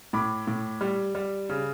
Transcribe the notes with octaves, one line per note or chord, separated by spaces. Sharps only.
A2 B5 D6
A2
G3
G3
C#3